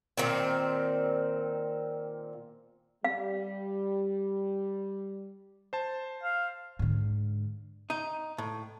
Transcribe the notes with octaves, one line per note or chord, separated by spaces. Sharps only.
A#2 D#3 C4
G3 F5
C5 A5
F5
G#2 D3
D#4
A2